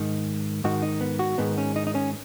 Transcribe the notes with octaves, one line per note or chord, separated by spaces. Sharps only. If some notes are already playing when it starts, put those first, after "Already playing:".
Already playing: G#2 D#3
G#2 D#3 F#4
D#4
B3
F#4
G#2 D#3 B3
C#4
D#4
D#4
C#4